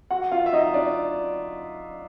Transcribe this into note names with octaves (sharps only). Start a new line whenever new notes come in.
F#4 F#5
F4 F5
E5
D#4 D#5
D4 D5